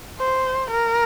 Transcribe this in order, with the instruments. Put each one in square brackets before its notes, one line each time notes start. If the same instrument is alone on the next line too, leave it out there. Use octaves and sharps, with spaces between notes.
[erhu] C5
A#4